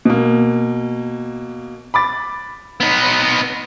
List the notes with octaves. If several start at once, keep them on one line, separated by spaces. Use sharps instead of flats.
B2 A#3
B5 D6 A6
B3 D#4